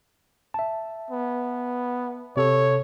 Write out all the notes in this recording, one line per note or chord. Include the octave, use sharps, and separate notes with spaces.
E5 A5
B3
C3 A4 C#5